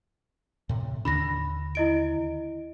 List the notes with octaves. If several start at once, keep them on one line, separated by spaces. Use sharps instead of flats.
A2 C3
D#2 D3 D4 B5 A#6
E4 D#5 D7